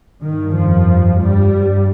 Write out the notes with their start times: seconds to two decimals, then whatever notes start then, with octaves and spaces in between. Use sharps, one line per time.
0.23 G2 D#3
0.55 F2 F3
1.20 G2 G3
1.52 G2